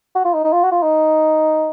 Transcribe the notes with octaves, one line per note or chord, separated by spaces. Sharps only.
F#4
F4
D#4
D#4
F4
F#4
F4
D#4